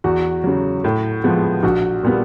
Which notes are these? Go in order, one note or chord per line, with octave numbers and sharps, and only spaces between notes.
E2 F#4
C#3 F#3
A2
F3 G#3 B3
A#1 F#4
A#2 G3 B3